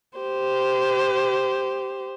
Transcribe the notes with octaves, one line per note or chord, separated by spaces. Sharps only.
G4 C5